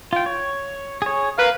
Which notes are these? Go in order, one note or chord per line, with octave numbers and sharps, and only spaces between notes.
F4 G5
C#5
G#4 C#5
A#4 B4 F5